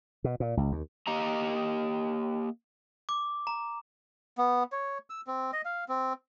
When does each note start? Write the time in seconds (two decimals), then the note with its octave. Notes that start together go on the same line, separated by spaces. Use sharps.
0.24 B2
0.40 A#2
0.57 C#2
0.72 D#2
1.07 A#3 G4 D#5 A#5
3.09 D6
3.47 A#5
4.38 B3
4.72 C#5
5.10 E6
5.27 C4
5.53 D#5
5.65 F5
5.89 C4